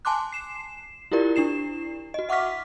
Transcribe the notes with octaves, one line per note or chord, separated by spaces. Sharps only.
G#5 A5 C6 D6 F#6
C7 E7
E4 F4 G4 A#4 D5
D4 E4 C7 E7
F#4 D#5
E5 F#5 C#6 D6 F6 B6